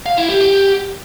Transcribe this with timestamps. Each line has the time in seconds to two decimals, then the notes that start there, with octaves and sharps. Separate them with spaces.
0.06 F5
0.18 E4
0.29 G4
0.41 G4